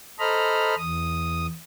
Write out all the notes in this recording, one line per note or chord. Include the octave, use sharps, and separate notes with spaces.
A4 C5 D#5 A#5 B5 F6
E2 D#6